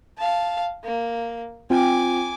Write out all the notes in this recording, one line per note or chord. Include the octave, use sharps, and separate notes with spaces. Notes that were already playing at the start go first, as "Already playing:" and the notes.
F5 A5
A#3
C4 F4 G5 G#5 D6